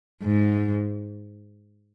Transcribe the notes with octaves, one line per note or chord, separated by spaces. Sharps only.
G#2